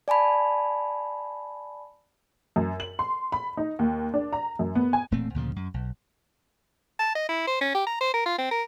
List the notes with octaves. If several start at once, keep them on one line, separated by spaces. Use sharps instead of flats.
D5 G#5 A5 B5
F#2
F#7
C6
B5
D#4
D#2
D4
A#5
F#2
B3
G#5
E1 A#2 A3 C4
D2 A#2 C#3 F3
F#2
B1
A5
D#5
E4
C5
C#4
G4
A#5
C5
A#4
F4
C4
A#4